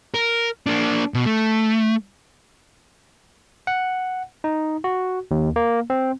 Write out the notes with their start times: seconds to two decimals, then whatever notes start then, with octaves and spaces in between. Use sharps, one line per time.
0.14 A#4
0.67 A#3 D4
1.14 B2
1.26 A3
3.67 F#5
4.44 D#4
4.84 F#4
5.31 D#2
5.56 A#3
5.90 C4